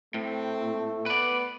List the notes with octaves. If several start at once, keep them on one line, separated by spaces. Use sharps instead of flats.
A2 A3 C4
B3 B4 D5